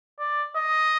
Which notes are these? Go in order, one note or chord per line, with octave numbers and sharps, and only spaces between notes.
D5
D#5